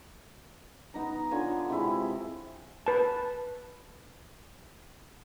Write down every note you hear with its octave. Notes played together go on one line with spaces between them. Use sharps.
B3 D#4 A#5
D3 F4 C#5 G#5
C3 G#3 E4
B4 A5